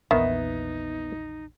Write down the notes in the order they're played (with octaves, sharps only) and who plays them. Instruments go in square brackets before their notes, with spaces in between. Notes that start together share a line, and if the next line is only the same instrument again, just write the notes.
[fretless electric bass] A#1 E2 [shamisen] D#3 [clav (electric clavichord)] B3 E5 [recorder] D#4